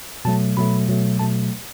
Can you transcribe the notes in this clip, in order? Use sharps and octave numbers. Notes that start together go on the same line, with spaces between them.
B2 F#3 A3 A5
B2 F#3 A3 B5
B2 F#3 A3
B2 F#3 A3 A5